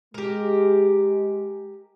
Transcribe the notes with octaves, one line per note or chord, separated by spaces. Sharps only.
G#3 G4 A#4